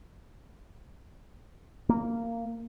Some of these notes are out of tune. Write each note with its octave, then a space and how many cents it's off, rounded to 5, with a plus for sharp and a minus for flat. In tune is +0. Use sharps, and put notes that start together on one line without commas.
A#3 -15